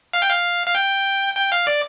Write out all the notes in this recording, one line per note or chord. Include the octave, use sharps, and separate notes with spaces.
F5
G5
F5
F5
G5
G5
F5
D5